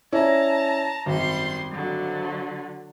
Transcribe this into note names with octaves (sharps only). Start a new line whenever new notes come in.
C#4 E4 D5 A5 A#5
G#1 F#2 G3 C6
D3 F#3